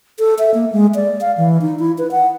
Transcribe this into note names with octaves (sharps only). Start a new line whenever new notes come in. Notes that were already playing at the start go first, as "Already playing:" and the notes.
A4
E5
A#3
G#3
D5
F5
E3
D#4
E4
B4
F#5